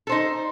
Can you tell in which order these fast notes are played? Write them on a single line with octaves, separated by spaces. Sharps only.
A4 C5 D#4